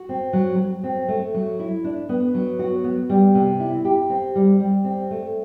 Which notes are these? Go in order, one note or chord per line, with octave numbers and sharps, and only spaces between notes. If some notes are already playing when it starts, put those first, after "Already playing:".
Already playing: F#4
C4
F#3
F#3
C4
A3
F#3
E4
D4
B3
F#3
F#4
B3
G3
C3
E4
G4
C4
G3
G3
C4
A3